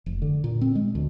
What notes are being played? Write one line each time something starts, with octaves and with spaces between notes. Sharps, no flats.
F1
D3
A#2
C4
G#3
D2